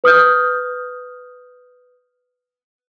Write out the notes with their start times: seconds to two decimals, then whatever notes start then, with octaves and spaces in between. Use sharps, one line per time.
0.04 B4 D#6 F6 G6